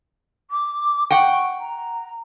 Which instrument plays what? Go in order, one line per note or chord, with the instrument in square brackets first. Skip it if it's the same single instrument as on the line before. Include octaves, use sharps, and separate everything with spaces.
[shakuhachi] D6
[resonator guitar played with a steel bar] F#5 G5 [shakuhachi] C#6
[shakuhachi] A#5